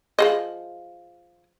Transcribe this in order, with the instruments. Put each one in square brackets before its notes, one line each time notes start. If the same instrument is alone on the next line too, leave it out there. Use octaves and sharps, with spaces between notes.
[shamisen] F3 G#4 D#5